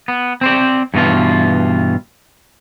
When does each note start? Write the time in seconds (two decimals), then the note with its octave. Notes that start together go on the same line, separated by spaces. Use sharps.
0.08 B3
0.41 C4 C5 D5
0.94 G2 B2 E3 F4